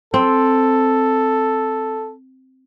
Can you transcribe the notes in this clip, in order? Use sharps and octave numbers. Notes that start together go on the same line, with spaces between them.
C4 A4